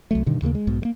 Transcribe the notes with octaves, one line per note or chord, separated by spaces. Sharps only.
C2 F#3 A3
G2 B2 D3 D#3
D#2 C#3 G#3 A#3
G#3
B1 G#2 B2
G3 A#3